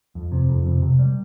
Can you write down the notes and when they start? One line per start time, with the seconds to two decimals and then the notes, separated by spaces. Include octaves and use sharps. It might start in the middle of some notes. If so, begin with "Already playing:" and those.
0.15 F2
0.32 C3
0.49 F2
0.66 C3
0.82 C3
0.99 G3